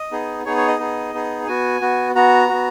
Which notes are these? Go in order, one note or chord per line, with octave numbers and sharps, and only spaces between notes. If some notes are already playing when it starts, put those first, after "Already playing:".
Already playing: D#5
B3 D#4 G#4
B3 D#4 G#4 C#5
C#5
D#5
B3 D#4 G#4
B3 D#4 G#4
B3 F#4 G#5
B3 F#4
B3 F#4 A#5
B3 F#4